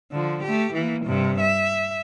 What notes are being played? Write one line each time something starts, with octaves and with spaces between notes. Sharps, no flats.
D3 F3
A3 G4
E3 A#3
G2 C3
E5